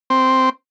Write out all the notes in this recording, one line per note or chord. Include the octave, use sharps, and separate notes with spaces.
C4